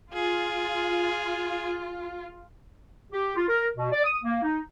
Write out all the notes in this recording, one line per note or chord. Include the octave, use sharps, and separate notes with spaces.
F4 G#4
G4
F4
A#4
B2
D5
D#6
A#3
D#4